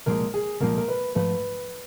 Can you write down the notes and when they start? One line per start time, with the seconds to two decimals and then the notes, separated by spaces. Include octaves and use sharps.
0.06 C2 A#2 F3 G#3 A#4
0.34 G#4
0.60 C2 A#2 F3 G#3 A#4
0.77 A#4
0.88 B4
1.15 G#2 F3 A3 B4